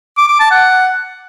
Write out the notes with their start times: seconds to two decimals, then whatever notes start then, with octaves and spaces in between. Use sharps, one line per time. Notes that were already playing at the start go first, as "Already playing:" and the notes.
0.17 D6
0.29 D6
0.40 A5
0.51 F#5